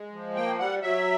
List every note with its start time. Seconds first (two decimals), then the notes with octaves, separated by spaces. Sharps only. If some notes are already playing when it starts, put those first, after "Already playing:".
Already playing: G#3
0.13 F3
0.36 A#3 G5
0.59 G3 F#5
0.82 F#3 E5